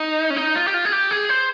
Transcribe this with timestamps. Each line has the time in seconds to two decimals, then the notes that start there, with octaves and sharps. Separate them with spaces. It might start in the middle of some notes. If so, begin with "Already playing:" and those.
Already playing: D#4
0.30 C#4
0.36 D#4
0.55 F4
0.67 G4
0.74 F4
0.85 G#4
0.92 G4
1.11 G#4
1.29 C5